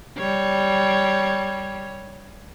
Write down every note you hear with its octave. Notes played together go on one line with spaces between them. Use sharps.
G3 C#5